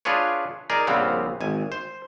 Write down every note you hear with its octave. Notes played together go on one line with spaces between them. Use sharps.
D4 F4 G#4 B4 C#5
D#4 G#4 A#4 D5
A#1 C#3 G3 B3 C4 F5
G#1 G#5
C5